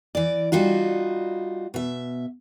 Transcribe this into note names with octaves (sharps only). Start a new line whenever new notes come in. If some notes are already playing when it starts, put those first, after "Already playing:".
E3 D5
G3 D#4 F4 F#4
B2 E5